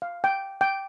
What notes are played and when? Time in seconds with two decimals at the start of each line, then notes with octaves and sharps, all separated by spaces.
0.02 F5
0.24 G5
0.61 G5